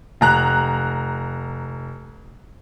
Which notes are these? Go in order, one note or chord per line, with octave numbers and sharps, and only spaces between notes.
F1 A#5 F#6